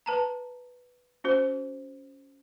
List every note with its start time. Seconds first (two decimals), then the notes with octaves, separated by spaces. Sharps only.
0.06 B4 A5 A#5
1.24 C#4 F#4 C5